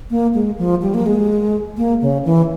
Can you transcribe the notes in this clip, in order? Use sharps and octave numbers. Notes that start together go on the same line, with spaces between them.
A#3
G#3
F3
G3
A#3
G#3
A#3
C#3
E3